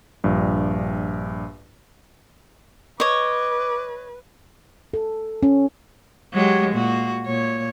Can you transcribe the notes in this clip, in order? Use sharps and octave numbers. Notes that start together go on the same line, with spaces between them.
A#1 G2
B4 C#5 D#5 D6
A4
C#4
F#3 G#3 G4
A#2 F#4
A#2 C#5